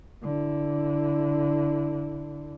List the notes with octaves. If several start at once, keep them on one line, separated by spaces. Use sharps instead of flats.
D3 E4